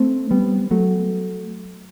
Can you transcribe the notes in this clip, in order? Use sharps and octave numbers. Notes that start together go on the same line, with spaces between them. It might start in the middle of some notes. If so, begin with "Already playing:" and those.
Already playing: A3 C4
G3 B3
F#3 A3